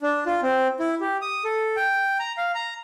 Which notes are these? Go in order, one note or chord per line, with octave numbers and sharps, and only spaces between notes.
D4
F4
C4
E4
G4
D#6
A4
G5
A#5
F5
A#5